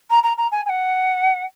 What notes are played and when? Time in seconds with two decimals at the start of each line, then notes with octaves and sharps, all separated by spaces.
0.10 A#5
0.23 A#5
0.38 A#5
0.51 G#5
0.66 G#5
0.69 F#5